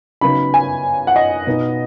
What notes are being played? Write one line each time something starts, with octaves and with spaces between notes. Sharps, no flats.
C#3 F#3 B3 D#4 B5
G#5
F#5
D#5
B2 B3 D#4